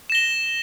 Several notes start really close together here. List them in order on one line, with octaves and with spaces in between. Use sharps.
E7 A#6 G7